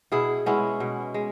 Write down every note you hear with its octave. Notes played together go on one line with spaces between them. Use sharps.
B2 E4 G#4
G#3 B3 C#4 E4
B2
G#3